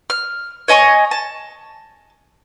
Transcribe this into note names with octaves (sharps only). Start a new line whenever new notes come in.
F6
C#5 D#5 G#5 C#6
A5